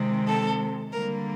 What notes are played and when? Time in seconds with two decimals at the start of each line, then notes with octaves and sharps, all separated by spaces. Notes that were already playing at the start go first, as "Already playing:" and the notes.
Already playing: C3 D#3 G#3 C4
0.27 A4
0.92 D3 G3 A#3 A#4